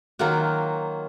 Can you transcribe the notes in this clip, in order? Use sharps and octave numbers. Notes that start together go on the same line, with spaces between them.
D#3 F#3 A#3 F4 F#4